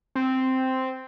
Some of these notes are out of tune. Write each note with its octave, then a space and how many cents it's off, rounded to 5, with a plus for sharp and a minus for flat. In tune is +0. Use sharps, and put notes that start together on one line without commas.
C4 -5